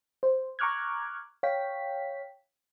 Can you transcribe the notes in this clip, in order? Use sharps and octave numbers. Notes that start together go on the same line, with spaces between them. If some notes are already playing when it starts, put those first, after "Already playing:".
C5
A#5 C#6 D6 F6 F#6 G#6
C#5 F5 G5 B6